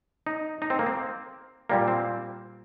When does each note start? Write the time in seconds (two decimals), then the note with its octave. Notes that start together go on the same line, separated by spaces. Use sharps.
0.26 D#4
0.62 D#4
0.70 C4
0.79 A#3
0.86 C4
1.70 A#2 G3 A#3
1.88 C4